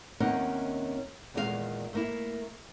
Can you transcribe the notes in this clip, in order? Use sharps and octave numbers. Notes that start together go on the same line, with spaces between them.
D#2 C3 A#3 C#4 D#4 F#5
E2 A#2 D#3 G#3 G#4 F5
A3 A#3 E4